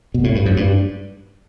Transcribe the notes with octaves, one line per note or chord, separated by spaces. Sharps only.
B2
A2
G2
F#2
G2